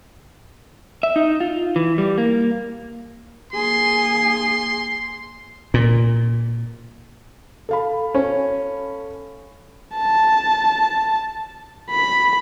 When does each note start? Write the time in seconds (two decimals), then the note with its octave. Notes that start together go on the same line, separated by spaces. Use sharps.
1.03 E5
1.16 D#4
1.41 F4
1.76 E3
1.98 G3
2.18 A#3
3.53 A#3 G#4 C6
5.74 A#2
7.69 A4 F5 B5
8.15 C#4
9.96 A5
11.91 B5